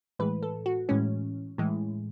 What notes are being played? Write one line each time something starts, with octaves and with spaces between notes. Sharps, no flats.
A2 E3 G#3 B4
A4
F#4
A2 E3 G#3 C#4
A2 E3 G#3